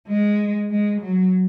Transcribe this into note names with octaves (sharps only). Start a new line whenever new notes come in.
G#3
G#3
F#3